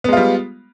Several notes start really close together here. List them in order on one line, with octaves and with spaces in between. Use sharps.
B3 G#3 F4 G3